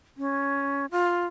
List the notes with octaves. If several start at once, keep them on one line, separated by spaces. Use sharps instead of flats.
C#4
F4